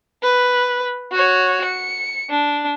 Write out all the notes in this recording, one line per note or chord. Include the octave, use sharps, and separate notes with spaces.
B4
F#4 C#5
C#7
D4